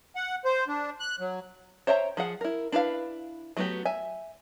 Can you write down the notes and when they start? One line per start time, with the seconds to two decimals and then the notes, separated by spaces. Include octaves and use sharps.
0.16 F#5
0.45 C5
0.68 D4
1.00 F#6
1.20 F#3
1.87 C5 C#5 E5 G5 A#5
2.17 F3 G#4 F#5
2.41 E4 A#4
2.72 D4 E4 B4 C5 F5
3.57 F#3 A3 B3 F#4 G4
3.85 E5 G#5